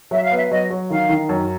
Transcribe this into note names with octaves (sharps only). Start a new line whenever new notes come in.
F#3 E5
F5
B3 E5
F#3 D#5
F#3
D#3 F5
D#3
F#2